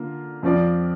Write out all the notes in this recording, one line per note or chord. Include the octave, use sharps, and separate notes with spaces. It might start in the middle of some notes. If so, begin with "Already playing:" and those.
Already playing: D3 A#3 F4
F2 F3 C4 F4 D5